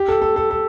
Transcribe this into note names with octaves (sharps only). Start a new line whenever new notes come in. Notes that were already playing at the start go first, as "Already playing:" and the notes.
Already playing: G4
A4
A4
A4
A4